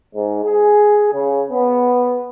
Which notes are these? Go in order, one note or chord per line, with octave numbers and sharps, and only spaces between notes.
G#2
G#4
C#3
B3